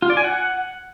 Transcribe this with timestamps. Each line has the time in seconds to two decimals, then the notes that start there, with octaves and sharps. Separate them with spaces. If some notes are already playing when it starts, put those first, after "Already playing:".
0.02 F4
0.10 D5
0.17 G#5
0.24 F#5